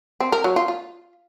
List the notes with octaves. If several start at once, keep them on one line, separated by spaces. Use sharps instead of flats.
C4
A#4
F#3
F4
F4